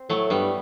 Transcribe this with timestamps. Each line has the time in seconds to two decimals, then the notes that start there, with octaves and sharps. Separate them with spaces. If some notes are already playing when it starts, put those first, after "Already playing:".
Already playing: C4
0.10 A2 F#3 A3
0.30 G2 G3 B3